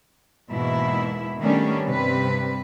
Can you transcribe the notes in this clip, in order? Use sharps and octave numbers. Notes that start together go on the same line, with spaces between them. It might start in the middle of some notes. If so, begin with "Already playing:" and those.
E2 G#2 B2 A#3 E4 E5
D#3 G3 A3 B3 C#4 D4
G2 C3 G3 B4